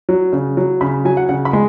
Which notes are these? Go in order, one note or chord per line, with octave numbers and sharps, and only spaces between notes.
F#3
C#3
F#3
C#3 B5
F#3 G#5
F#5
C#3 F#5
B5
G#3